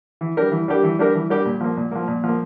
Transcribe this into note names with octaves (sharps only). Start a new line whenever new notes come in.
E3
G3 D4 G4 A#4
E3
G3 D4 G4 A#4
E3
G3 D4 G4 A#4
E3
G3 D4 G4 A#4
A#2
F3 A#3
A#2
F3 A#3
A#2
F3 A#3